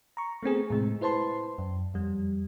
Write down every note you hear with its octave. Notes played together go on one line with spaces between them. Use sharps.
A#5 C#6
A3 B3 C4 G#4
A2 C3 G#3
E4 B4 C5 A5 C6
F#2
F2 G3